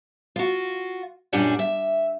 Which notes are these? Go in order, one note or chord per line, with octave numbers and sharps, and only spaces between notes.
F4 F#4
F#2 A#2 G3 D4 F#5 G#5
E5